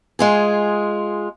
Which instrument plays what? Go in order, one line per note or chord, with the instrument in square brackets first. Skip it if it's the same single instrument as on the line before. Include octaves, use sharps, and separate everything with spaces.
[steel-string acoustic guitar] G#3 F4 G#4